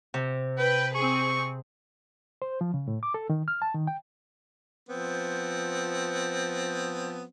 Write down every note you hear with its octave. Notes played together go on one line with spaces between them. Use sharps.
C3
B4 G5
C4 G#4 C#6
C5
F3
C#3
A2
D6
A4
D#3
F6
A5
D#3
G5
F3 B3 C4